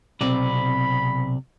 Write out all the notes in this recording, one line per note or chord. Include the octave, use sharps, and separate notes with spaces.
B1 C3 C4 D5 B5